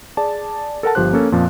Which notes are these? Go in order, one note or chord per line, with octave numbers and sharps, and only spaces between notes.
G#4 D5 A5
A4 A#4 F#5 A5
G1 F3 G4 C5 F#6
A#3 C#4 A4
F2 A#2 F3